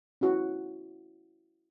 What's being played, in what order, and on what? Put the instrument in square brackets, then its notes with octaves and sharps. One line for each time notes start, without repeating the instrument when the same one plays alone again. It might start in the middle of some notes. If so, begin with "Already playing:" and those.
[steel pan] C#4 E4 F#4